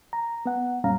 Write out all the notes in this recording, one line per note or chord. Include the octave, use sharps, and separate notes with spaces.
A#5
B3 F#5
F#2 A#2 G3 C#4 F5 A#5